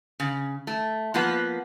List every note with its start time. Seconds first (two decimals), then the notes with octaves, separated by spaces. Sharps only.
0.20 C#3
0.67 A3
1.14 F3 A#3 B3 B4